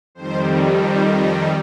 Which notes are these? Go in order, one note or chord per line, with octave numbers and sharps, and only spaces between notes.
F2 D#3 G3 C5
C5
D#5